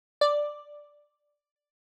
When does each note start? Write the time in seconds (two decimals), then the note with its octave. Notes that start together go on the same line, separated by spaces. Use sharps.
0.21 D5